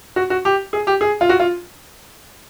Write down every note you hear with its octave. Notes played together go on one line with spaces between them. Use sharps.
F#4
F#4
G4
G#4
G4
G#4
F4
F#4
F4